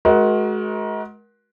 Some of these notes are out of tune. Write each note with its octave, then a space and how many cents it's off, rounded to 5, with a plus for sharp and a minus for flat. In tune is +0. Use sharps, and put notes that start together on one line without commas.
G#3 +35 F#4 +0 A#4 +30